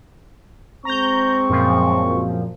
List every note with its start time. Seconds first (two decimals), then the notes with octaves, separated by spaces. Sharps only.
0.85 G#3 C4 A#5 C#6 G6
1.50 F#2 A#2 F3